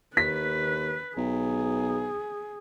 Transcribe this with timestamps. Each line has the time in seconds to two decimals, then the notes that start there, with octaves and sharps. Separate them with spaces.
0.17 D#2 B4 B6
1.17 B1 G#4